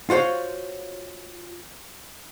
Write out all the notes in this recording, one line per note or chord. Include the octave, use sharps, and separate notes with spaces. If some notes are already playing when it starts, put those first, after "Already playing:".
F4 F#4 C5 C#5